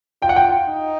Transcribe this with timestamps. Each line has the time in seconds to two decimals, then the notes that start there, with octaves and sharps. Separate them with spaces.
0.22 F4 G5
0.29 F#5
0.36 G5
0.69 D#4